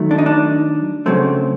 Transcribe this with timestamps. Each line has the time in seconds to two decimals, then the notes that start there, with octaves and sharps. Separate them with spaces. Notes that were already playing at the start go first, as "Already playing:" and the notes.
Already playing: D#3 F#3 A3
0.11 D4
0.18 D#4
0.26 D4
1.06 C#3 F#3 A3 C4